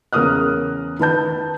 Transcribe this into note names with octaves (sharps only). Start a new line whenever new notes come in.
E2 C#3 A#4 D#6 F6 F#6
D#3 B4 A5 G6